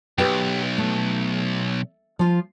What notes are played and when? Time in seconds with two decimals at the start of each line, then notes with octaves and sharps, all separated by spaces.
0.18 B1 G4 B4 G5
0.78 A3
2.19 F3 F4